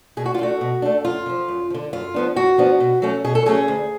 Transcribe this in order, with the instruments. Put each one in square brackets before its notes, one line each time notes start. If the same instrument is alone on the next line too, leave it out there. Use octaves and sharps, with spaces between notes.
[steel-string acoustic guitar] B2 G#4
F#4
F4
A3 D4 F#4
B2
A3 D4
F#2 F4
D3
F3
F#2
F3
D3
F#2 F4
F3 B3 D4
F#2 F#4
F3 B3 D4
B2
F#3 A3 C#4
B2 G#4
A4
F#3 A3 C#4 G#4
D2